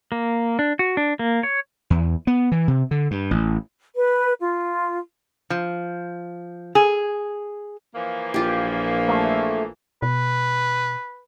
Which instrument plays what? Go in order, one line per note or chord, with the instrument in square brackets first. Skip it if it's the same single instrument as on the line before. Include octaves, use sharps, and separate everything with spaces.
[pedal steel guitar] A#3
D4
F#4
D4
A#3
C#5
[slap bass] E2
B3
E3
C3
D3
G2
A1
[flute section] B4
F4
[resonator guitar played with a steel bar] F3
G#4
[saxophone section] E3 F3 A#3
[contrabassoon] A#1 [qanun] F4 G4
[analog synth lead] A3
[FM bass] B2 [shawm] B4